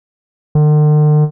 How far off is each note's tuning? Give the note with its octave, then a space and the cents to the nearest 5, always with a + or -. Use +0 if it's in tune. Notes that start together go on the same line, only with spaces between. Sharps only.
D3 +45